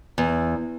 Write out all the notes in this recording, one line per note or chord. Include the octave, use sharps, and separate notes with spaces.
E2